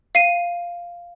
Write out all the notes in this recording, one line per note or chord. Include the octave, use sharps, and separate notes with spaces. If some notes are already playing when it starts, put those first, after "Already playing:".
F5 C7 D#7